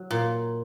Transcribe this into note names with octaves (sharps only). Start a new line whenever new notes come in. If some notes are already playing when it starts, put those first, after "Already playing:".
Already playing: F#3
A#2